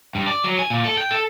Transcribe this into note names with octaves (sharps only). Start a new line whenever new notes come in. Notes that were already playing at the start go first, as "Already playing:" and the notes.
G2
D5
F#3
G#5
A#2
A4
G5
A4